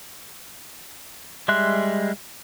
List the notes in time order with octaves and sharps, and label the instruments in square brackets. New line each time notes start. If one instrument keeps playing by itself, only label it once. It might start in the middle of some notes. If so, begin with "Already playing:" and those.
[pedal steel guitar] G3 G#3 E5 C6 F#6